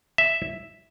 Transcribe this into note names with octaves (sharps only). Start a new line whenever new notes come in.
E5